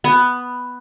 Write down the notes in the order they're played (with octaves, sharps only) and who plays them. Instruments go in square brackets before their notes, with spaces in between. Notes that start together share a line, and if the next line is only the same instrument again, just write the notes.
[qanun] B3